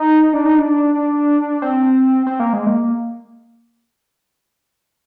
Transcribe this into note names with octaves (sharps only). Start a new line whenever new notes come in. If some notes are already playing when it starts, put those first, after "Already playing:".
Already playing: D#4
D4
D#4
D4
C4
C4
A#3
G#3
A#3